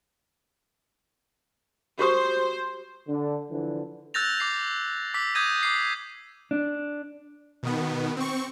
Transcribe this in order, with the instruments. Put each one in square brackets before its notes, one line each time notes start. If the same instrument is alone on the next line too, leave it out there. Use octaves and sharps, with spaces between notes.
[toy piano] F#4 G4 D#6 [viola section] C5
[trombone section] D3
D3 E3 F3
[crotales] E6 F#6 G6 A6 A#6 F7
D6 C7
D6 E6 B6
D6 D#6 G6 G#6 A#6 D#7
D6 C7
[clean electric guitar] D4
[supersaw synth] B2 D#3 B3
C4 C#6